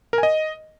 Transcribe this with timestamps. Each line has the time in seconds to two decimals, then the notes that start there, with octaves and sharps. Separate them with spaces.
0.13 A#4
0.18 G#5
0.23 D#5